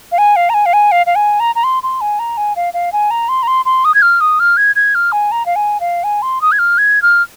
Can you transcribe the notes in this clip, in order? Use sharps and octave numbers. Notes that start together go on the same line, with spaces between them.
F5
G#5
F5
A#5
G#5
F5
G#5
F5
F5
G#5
A#5
A#5
C6
C6
G#5
A#5
G#5
F5
F5
G#5
A#5
C6
A#5
C6
C6
D#6
G#6
F6
D#6
F6
G#6
G#6
F6
G#5
A#5
F5
G#5
F5
G#5
C6
D#6
G#6
F6
G#6
F6